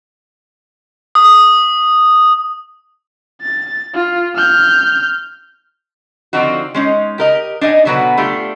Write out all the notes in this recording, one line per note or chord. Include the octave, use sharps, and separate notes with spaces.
D#6
A6
F4
F6 G6
D3 F3 C4 D#4 F#4
G#3 C#4 D#4
G4 A#4 D#5
D4 D#4 D#5 F5 G#5
B2 D3 F#3 B3 F#4
A3 D4 F4 G4